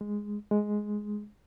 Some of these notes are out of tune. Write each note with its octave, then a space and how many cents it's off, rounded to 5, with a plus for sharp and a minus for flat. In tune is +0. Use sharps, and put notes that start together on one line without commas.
G#3 -5
G#3 +5